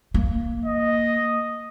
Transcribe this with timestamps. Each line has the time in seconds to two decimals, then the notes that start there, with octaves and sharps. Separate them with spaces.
0.14 A#3
0.65 D#5